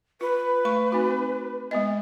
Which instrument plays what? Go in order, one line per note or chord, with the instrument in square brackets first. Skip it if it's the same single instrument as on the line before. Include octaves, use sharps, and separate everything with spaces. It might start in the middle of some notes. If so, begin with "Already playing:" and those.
[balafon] F4 [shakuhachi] B4
[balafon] A3 C#6
C4 D#4 F#4
G#3 B3 D#5